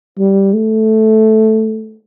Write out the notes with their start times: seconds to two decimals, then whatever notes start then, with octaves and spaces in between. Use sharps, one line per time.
0.18 G3
0.54 A3